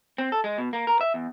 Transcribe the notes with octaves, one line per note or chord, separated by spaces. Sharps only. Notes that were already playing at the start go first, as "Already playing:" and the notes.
C4
A4
G#3
B2
A#3
A#4
E5
E2